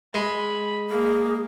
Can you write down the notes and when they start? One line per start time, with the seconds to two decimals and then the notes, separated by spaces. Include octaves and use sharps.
0.14 G#3 B5
0.90 A#3 G#4